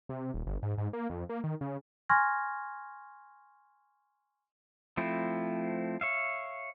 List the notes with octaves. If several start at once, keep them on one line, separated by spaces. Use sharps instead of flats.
C3
D#1
G1
G#2
G#2
A#3
F2
A#3
D#3
C#3
G#5 C6 C#6 F6 G#6 A#6
F3 A3 C4 E4
C#5 E5 F5